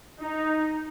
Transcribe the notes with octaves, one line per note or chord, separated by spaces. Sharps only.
D#4